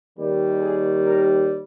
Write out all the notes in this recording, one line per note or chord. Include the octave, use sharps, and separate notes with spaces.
D#2 D#3 G3
G#4
A#4